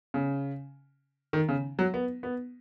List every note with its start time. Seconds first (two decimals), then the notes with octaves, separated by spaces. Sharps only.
0.14 C#3
1.33 D#3
1.49 C#3
1.79 F#3
1.94 B3
2.23 B3